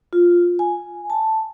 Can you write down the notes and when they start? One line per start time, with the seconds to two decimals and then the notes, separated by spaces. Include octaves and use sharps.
0.13 F4
0.59 G#5
1.10 A5